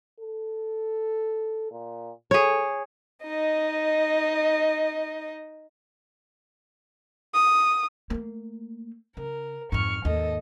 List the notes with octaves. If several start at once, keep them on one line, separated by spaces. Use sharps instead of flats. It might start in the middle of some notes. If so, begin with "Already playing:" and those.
A4
A#2
G#4 A4 C#5
D#4 D#5
D#6
A3 A#3
C#3 A#4
F2 G#2 C#6 F6
D#2 G#2 A4 D#5